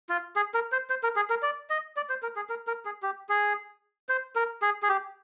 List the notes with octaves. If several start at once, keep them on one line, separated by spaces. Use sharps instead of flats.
F4
G#4
A#4
C5
C5
A#4
G#4
A#4
D5
D#5
D5
C5
A#4
G#4
A#4
A#4
G#4
G4
G#4
C5
A#4
G#4
G#4
G4